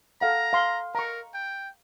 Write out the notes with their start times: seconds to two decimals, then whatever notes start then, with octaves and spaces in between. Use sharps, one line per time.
0.21 A4 F5 F#5 A#5
0.53 F5 C6
0.95 A#4 A#5 C#6
1.34 G5